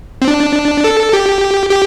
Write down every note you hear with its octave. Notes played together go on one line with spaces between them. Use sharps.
C4
D4
A4
G4
G4